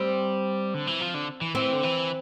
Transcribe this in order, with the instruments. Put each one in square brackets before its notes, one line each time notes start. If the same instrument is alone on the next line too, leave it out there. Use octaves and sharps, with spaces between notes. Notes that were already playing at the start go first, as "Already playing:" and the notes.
Already playing: [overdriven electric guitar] G3 [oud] C4
[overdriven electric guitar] D3
E3
F3
D3
E3
[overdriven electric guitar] E3 [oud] C4
[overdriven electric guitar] D3
E3